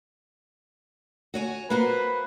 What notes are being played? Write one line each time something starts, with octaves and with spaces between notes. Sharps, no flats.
F#4 C#5 G#5
A#3 F#4 B4 C5